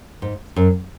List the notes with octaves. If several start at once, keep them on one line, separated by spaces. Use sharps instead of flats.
G#2
F#2